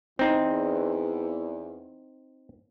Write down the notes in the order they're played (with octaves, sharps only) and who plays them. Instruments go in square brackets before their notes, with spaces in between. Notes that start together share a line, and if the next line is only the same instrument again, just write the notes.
[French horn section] E2 [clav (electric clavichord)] C4 D#4